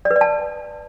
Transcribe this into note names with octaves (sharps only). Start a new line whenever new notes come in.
D5
B4
D5
A5